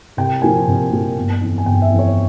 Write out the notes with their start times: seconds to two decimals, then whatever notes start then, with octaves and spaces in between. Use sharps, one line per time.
0.17 C2 G5
0.42 A#2 F3 A#3 G#5
0.68 C2
0.92 A#2 F3 A#3
1.17 G1
1.41 F2 E3
1.58 G#5
1.66 G1 G5
1.82 E5
1.91 F2 E3
1.99 C#5